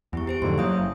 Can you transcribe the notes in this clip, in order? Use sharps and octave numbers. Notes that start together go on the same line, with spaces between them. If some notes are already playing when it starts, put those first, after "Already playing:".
E2 E4 G4 C#6
G4 C5 D7
F2 G#2 D3 C6
F#3 A#3 E4 D#6 G6
F#1